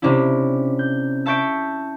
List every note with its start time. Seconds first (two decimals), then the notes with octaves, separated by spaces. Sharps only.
0.02 C3 C#4 D4 E4
0.79 G6
1.26 E5 A5 C#6 G6 B6 D7